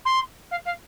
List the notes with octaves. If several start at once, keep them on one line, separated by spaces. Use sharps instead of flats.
C6
F5
F5